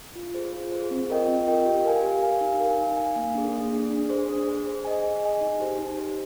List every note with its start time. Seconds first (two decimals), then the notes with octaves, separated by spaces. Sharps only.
0.16 F4
0.34 G#4 C5
0.53 F4
0.72 G#4 C5
0.91 C4
1.09 F4 A#4 D#5 G5
1.28 C4
1.47 F4 A#4 D#5 G5
1.66 G4
1.85 A#4 F5 G#5
2.03 G4
2.22 A#4 F5 G#5
2.41 D#4
2.60 A#4 F5 G#5
2.78 D#4
2.97 A#4 F5 G#5
3.16 A#3
3.35 D4 G#4
3.53 A#3
3.72 D4 G#4
3.90 D4
4.09 G#4 C5
4.28 D4
4.47 G#4 C5
4.66 G#4
4.85 D#5 G#5
5.04 G#4
5.22 D#5 G#5
5.41 D#4
5.60 G4 C5
5.78 D#4
5.97 G4 C5